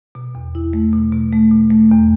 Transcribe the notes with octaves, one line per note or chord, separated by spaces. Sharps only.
B2
E2
E4
A3
B2
B2
A3
B2
A3
E2